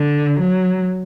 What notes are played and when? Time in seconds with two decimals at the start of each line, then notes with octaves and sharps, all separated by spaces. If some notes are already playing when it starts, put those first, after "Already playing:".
Already playing: D3
0.40 F#3